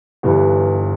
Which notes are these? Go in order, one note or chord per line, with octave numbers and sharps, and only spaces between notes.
G1 G2 E3 G3